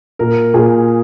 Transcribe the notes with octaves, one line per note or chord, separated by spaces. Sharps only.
A#2 A#4
A#2 G#4